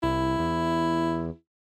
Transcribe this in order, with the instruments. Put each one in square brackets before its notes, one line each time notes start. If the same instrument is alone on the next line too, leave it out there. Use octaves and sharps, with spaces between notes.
[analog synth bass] C2 [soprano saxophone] E4
[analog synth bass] E2